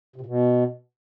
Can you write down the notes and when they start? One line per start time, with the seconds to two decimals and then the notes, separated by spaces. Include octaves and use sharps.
0.16 C3
0.21 A#2
0.26 B2